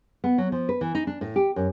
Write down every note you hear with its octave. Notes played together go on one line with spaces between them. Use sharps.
B3
F#3
F3
B4
E3
D#4
D4
A2
G4
F#2